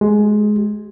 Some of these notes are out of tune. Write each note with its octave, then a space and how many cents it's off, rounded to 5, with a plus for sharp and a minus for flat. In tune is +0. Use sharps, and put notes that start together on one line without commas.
G#3 +15 G4 -30